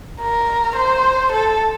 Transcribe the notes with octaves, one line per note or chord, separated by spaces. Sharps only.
A#4
C5
A4